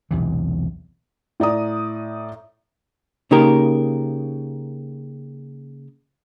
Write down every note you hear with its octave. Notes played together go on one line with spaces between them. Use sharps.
B1 E2 C3 E3
A2 D5 A#5 D#6
C#3 A#3 D#4 G4 A#4